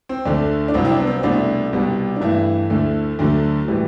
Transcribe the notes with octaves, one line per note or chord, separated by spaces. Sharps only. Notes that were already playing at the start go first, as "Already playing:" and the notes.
C4
D2 D3 A3 D4
D4
C2 C3 F#3 C4
E4
D4
B3
C4
C2 B2 A3 D4
C2 B2 G3
D4
G2 E3 A3 E4
D2 D3 A3
D2 D3 F#3 A3
A2 E3 G3